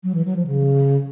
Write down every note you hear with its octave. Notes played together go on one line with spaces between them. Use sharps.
F#3
E3
F#3
F3
C#3